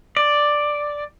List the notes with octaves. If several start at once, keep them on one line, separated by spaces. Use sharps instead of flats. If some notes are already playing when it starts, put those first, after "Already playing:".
D5